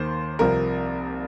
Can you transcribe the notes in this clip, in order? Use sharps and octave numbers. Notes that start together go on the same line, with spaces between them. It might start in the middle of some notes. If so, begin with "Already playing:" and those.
Already playing: D#2 D#3 A#3 C5
C2 C3 F3 A#4